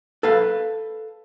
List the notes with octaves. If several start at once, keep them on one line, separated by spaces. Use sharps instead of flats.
A4 B4 F5